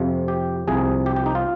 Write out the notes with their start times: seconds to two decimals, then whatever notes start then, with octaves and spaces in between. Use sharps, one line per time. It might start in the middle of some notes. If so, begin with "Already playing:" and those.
Already playing: F2 C3 F3
0.28 G4
0.67 C2 C3 F3 G#4
1.06 G4
1.16 G4
1.26 D#4
1.35 F4